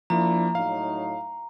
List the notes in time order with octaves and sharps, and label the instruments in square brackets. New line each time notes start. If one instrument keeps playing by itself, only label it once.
[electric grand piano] F3 A#3 [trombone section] D4 E4 [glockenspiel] A#5
[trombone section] A2 F#3 D#4 [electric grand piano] F5